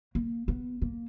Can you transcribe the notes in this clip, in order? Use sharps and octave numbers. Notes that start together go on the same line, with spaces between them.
A#3
B3
A#3